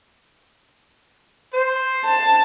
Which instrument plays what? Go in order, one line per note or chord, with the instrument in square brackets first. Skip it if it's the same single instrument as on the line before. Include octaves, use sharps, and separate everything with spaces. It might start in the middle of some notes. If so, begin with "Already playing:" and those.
[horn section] C5
[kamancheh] A5